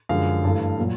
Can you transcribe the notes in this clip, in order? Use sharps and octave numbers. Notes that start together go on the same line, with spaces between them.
F#2 D3 F3 G#3 F5
G2 E3 A3
A#2 F#3